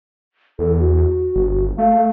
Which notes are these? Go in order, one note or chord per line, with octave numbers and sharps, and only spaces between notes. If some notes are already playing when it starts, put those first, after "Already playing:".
E2 A4
F#4
G1
A3 F5